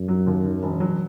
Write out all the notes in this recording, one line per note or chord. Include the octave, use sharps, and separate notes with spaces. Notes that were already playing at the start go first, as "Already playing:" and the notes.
Already playing: F#2
F#3
D#2
D#3
E1
F#3